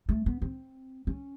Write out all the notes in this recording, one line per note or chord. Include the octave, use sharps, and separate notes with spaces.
A3
B3
C4
C#4